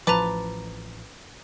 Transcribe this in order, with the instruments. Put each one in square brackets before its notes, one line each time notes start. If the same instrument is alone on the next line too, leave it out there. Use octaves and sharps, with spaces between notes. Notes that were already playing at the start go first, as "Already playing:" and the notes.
[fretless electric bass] A1 F3 [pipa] B4 A5 [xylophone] A#5 D6